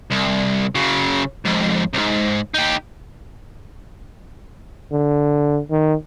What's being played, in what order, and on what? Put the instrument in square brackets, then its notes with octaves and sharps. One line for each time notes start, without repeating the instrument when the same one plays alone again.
[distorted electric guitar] C2
C#3 F#3
F2 G#2
C2 G#2
D#4 G4
[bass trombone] D3
D#3